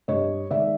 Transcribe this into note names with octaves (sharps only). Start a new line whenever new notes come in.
G2 C#5 D#5
D#3 G#3 D5 E5